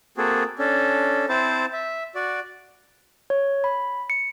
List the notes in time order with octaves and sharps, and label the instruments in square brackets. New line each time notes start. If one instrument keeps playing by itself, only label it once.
[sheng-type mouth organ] A#3 C4 F#4 G#4 A4
C#4 D4 A4
C4 E4 C5 A5
E5
F#4 D5
[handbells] C#5
B5
C#7